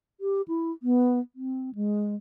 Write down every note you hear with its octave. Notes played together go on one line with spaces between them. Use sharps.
G4
E4
B3
C4
G#3